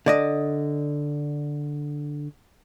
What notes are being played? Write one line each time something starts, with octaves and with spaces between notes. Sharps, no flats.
D3 D5 D#5